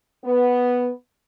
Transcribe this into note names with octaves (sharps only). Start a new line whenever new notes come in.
B3